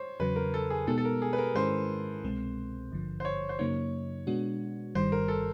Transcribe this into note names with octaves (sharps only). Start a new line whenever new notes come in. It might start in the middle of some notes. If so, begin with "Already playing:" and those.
Already playing: C5 C#5
E2 C#3 F#3 B4
A#4
A4
G#4
B2 G#3 B3 D#4 G4 A4
A4
A#4
G#4
B4
A#4
G#2 D#3 G#3 C#4 E4 C5
C2 B2 G#3 C4
G#1 G2 D3 F3
C5
C#5
C5
F#2 C#3 F#3 A#3 D#4 C#5
B2 G#3 B3 D4 F#4
G1 G2 D#3 G3 C5
A#4
A4